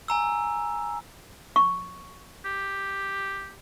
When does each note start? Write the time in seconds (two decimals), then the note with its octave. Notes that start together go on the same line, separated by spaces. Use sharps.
0.08 G#5 A#5 E6
1.56 C#6
2.45 G4